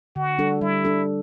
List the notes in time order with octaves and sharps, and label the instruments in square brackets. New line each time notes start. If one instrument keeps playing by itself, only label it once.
[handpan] D3 [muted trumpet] F#4
[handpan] G3 D4 A4
[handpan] G3 [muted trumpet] E4
[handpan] D4 A4